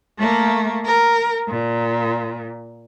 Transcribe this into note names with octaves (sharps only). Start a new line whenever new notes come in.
A3 A#3
A#4
A#2